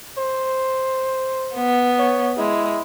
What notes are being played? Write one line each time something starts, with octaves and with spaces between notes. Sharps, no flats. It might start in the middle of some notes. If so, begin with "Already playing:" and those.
C5
B3
C#5
G#3 E4